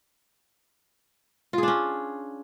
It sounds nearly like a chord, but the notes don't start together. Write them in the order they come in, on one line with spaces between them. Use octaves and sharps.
F4 G#4 D4 C#4